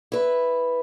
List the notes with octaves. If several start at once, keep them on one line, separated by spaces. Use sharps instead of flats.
E4 B4